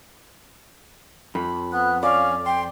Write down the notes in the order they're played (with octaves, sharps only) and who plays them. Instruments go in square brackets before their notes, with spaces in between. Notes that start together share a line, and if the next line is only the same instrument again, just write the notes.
[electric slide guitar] F2 [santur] B5
[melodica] B3 [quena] F#6
[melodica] C#4 [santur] D5 [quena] F5
[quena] G5 [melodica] C6